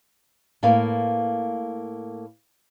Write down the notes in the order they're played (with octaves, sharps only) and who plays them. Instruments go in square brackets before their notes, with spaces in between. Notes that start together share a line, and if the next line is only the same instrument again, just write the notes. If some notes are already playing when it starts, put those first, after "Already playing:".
[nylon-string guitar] A2 A#3 B4 F5